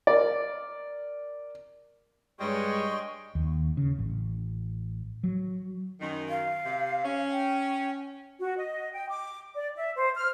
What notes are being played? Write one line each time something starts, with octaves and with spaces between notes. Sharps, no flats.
A#4 D5
G2 G3 G#3 C#5 D#5 G5 C6 C#6
D#2
C#3
A1
F#3
F#2 D#3
F5
C3
C#4
G5
F#4
D#5
G5
D6
D5
E5
C5
F6